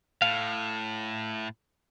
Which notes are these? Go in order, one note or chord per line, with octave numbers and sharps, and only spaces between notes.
A2 F5